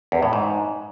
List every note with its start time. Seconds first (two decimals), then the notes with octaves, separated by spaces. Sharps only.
0.12 E2
0.23 A2
0.33 G#2